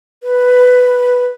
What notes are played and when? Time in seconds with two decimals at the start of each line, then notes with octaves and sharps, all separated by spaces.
0.23 B4